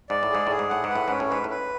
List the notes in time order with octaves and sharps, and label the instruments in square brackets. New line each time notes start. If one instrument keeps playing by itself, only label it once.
[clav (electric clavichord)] G#2 [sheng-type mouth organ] D5
[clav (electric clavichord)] A2
[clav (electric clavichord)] G#2 [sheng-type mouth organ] G#4
[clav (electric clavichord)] A2 [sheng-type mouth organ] G#4
[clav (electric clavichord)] G#2
[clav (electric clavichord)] A2 [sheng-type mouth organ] F#5
[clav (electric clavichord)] G#2
[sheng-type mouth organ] B4
[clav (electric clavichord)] A2
[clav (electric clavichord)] G#2 [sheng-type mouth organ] C#4
[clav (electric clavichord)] A2
[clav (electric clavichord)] G#2 [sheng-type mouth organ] B4
[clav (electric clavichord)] A2
[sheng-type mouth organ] B4